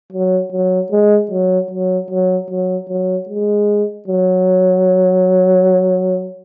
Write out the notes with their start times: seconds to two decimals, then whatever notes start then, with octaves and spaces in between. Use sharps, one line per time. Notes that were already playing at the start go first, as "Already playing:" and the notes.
0.13 F#3
0.53 F#3
0.92 G#3
1.32 F#3
1.71 F#3
2.11 F#3
2.50 F#3
2.89 F#3
3.29 G#3
4.08 F#3